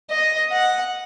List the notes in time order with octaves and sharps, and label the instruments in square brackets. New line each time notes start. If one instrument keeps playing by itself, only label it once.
[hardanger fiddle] D#5
F#5